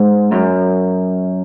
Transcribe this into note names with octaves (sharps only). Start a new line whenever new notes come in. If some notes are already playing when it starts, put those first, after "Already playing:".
Already playing: G#2
F#2